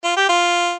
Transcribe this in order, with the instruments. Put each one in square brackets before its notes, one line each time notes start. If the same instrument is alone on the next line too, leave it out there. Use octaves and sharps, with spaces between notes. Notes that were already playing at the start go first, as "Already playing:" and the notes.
[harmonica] F4
G4
F4